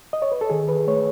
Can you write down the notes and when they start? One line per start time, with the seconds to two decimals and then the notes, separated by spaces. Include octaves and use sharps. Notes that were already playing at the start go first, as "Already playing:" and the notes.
0.13 D#5
0.22 C#5
0.32 B4
0.41 A4
0.50 D#3 G#4
0.69 B4
0.87 A3 C#5